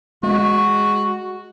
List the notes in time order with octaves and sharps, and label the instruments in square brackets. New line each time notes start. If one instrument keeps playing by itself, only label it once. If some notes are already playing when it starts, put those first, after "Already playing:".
[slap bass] G#3 [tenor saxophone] F#4